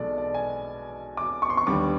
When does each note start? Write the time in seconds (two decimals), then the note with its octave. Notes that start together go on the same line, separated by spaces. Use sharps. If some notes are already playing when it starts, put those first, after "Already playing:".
Already playing: B1 B2 G#3 B3 A4 D5
0.18 D5
0.34 G#5
1.17 D6
1.42 C#6
1.50 C6
1.57 C#6
1.67 D#2 D3 G3 B3 D6